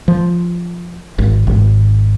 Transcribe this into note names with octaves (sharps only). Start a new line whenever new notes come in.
F3
G#1
G#1